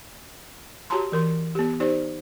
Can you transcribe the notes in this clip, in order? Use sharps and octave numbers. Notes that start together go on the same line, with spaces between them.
F#4 G4 C#5 A5 A#5 C6
E3 A#4 C6
B3 G4
D#4 G4 C5 D5